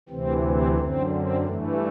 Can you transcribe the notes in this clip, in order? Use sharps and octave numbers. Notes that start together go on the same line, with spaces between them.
D2 C3 E3 C4
C4
F#2 D3 C4
C4
G2 E3 A3